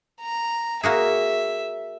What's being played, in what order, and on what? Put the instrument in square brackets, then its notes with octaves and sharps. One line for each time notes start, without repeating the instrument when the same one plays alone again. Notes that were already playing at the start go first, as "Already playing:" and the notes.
[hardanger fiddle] A#5
[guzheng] A#3 F#4 G#4 [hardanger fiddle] E5